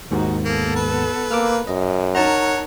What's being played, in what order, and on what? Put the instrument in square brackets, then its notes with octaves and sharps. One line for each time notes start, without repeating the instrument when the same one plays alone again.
[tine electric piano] D#2 G#2 D#3 [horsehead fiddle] D#4 F#4
[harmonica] A#3 [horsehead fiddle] B3 A4
[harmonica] B4
[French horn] A#3 [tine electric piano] D6 E6 F6
[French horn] F#2 [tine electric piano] D#5
[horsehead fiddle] D#4 A#4 [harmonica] C#5 F#5 [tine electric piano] A5 A#5